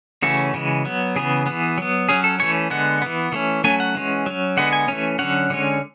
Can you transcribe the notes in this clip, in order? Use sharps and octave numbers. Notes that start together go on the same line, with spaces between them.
C#3 E3 A3 C#4 F#4
C#3 E3 G#3
F#3 B3
C#3 E3 B3 G#4
E3 B3
F#3 B3
F#3 C#4 G#4
A4
E3 A3 C#4 C#5
D3 G#3 B3 F#5
E3 B3
E3 A3 C#4
F#3 A3 C#4 G#5
F#5
E3 G#3 C#4
F#3 C#4
D3 G#3 B3 F#5
G#5
E3 A3 C#4
D3 F#3 C#4 F#5
D3 G#3 C#4